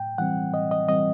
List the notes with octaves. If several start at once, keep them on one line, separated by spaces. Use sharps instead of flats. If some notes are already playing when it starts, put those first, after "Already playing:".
Already playing: A2 G5
E3 G3 C4 F#5
A2 D#5
D#5
E3 G3 C4 D#5